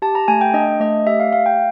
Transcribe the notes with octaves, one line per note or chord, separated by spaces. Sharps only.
G4 A5
A#5
A3 G#5
G5
D4 D#5
A3 D#5
G4 E5
F5
A3 F5
G5